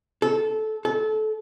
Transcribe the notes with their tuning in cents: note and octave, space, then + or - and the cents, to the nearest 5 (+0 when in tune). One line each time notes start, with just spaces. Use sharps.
A4 -15
A4 -25